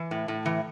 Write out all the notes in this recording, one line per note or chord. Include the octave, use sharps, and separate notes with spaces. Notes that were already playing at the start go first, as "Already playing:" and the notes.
Already playing: E3
A2
A2
E3